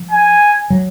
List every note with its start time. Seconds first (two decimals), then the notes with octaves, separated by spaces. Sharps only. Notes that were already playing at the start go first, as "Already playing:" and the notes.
Already playing: F3
0.11 G#5
0.70 F#3